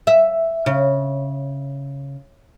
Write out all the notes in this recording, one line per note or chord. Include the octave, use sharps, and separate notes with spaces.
E5
C#3